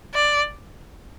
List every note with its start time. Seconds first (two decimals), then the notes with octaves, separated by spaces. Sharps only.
0.14 D5